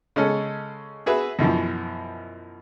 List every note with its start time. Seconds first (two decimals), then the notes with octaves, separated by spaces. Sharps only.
0.16 C#3 G#3 C#4 A4
1.06 F#4 G#4 B4 E5
1.39 F#2 B2 E3 F3